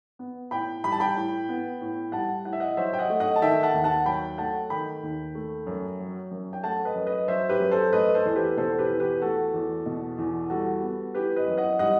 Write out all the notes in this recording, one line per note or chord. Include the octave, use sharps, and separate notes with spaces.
B3
A2 G5 B5
G3 B5
A5
G5 B5
A2
B3
A2
G3 F#5 A5
A2 F#5
E5
D#5 F#5
F#3 C5 E5
G5
D#5 F#5
A3
D#5 F#5
A5
D#3 E5 G5
F#5 A5
D#2
F#5 A5
F#3 G5 B5
A3 F#5 A5
D#3 G5 B5
D#2
A3
F#2
F#3
F#2
G5
A3 F#5 A5
B4 D#5
F#2
B4 D#5
F#3 C5 E5
G4 B4
F#2
A4 C5
A3 B4 D#5
A4 C5
E2 C5
G4 B4
B2 A4 C5
C5
G4 B4
E2
G4 B4
A3 F#4 A4
E2
B2
E2
G3 F#4 A4
B3
E3 G4 B4
B4 D#5
F#2
D#5 F#5
G3 D#5 F#5